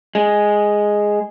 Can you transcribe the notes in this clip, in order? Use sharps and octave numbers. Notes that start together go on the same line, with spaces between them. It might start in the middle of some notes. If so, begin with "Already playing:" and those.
G#3